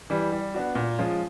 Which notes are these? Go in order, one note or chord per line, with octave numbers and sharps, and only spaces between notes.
E3 G3
G3
B3 D4 F#4
A#2
F3 G#3 C#4 F4